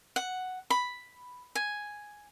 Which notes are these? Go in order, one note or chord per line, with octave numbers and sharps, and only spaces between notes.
F#5
B5
G#5